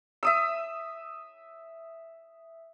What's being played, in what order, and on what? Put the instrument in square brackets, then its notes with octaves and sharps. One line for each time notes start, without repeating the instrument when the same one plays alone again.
[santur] E5 D#6 E6